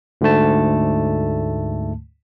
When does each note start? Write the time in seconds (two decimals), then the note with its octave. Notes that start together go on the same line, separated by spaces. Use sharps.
0.21 D2 G#2 D3 A3 A5